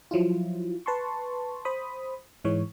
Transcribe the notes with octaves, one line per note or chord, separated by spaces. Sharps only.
F3 F#3 E4 F4
B4 A5 C6 C#6
C5 B5 D#6
G#2 E3 G#3 C#5